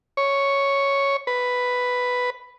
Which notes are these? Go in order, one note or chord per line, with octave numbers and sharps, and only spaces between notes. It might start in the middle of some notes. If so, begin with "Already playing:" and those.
C#5
B4